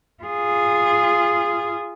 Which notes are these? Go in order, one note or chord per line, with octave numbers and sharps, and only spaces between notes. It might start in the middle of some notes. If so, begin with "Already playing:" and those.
F4 G#4